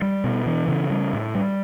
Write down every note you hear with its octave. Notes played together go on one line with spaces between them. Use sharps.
G3
B2
E3
C#3
G3
A2
G3